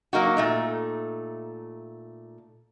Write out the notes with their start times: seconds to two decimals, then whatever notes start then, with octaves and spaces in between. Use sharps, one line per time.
0.13 F#3 A#3 D#4 F#4
0.37 A#2 A3 D#4